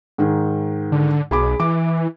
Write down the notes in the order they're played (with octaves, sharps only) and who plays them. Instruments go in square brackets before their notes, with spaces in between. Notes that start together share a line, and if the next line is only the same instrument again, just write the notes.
[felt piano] G#2 D#3 G#4
[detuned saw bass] D3
[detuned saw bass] B1 [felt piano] G#4 B5 D6
[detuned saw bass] E3 [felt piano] D6